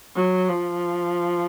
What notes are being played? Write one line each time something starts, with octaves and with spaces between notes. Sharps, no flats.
F#3
F3